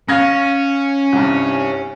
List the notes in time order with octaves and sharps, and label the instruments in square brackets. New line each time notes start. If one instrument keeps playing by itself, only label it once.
[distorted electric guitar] C#4 [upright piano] F5 G#6 A#6
[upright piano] C2 G2